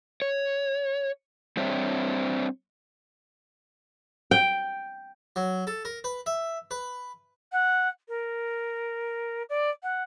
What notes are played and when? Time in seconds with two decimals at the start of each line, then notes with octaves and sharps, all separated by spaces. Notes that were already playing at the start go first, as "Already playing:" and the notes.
0.22 C#5
1.57 G3 C4 D4 C5 C#5 E5
4.31 G5
5.36 F#3
5.67 A4
5.85 A#4
6.04 B4
6.26 E5
6.71 B4
7.52 F#5
8.08 A#4
9.49 D5
9.83 F#5